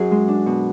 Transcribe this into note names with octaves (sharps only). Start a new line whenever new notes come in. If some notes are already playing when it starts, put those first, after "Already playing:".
Already playing: F#2 C#4 F#4 G#4
G#3
D4
B2